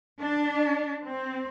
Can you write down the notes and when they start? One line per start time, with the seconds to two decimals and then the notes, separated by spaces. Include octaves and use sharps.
0.20 D4
1.03 C4